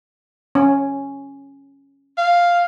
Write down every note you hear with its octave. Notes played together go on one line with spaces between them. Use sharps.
C#4
F5